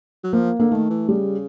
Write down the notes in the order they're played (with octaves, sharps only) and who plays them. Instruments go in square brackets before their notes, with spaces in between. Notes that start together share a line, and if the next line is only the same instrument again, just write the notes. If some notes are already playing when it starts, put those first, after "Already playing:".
[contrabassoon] F#3
[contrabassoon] F3 [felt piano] A#3
[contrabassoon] D3 [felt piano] A#3
[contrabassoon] D#3 [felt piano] A3
[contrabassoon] E3
[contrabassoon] C#3 [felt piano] G3